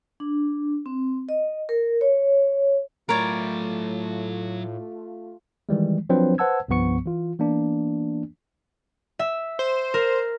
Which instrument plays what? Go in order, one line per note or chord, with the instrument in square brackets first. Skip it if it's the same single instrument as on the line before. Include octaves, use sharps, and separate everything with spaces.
[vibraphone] D4
C4
D#5
A#4
C#5
[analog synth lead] A2 [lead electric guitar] F#3 B5 [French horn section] A3 F4 [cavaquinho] A#4 C#5 D5
[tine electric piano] D#3 E3 G3 G#3
F3 F#3 C4 D4 B4 C5
B4 C5 F#5 A5 E6 G#6
C2 G2 F3 B3 C#6 C#7
E3 F4
E3 A#3 B3 D4
[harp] E5
[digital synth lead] C5
[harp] A#4